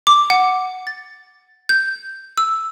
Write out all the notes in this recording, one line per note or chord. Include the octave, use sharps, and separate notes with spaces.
D6
F#5
A6
G6
E6